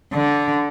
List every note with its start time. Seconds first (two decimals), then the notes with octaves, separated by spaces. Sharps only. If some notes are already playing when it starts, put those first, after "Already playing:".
0.13 D3